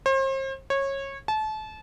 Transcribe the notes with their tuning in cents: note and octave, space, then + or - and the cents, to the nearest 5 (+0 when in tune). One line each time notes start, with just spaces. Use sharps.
C5 +40
C#5 -20
A5 -30